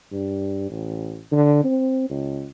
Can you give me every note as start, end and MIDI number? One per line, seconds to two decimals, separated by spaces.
0.12 0.68 43
0.70 1.21 33
1.31 1.63 50
1.64 2.07 60
2.10 2.48 37